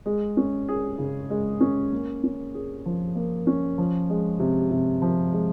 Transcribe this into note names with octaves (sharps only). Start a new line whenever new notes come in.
G#3
C#4
G#4
C#3
G#3
C#4
A#3
C#4
G#4
F3
A#3
C#4
F3
G#3
C3
C3
F3
G#3